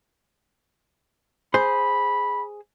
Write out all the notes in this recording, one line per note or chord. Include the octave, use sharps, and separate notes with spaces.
G#4 C5 B5